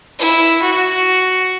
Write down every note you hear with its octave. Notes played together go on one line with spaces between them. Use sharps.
E4
F#4